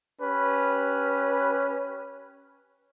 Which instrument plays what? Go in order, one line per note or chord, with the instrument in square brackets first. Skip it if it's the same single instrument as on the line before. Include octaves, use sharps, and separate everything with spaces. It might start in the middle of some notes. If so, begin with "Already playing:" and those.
[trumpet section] C#4 G4 B4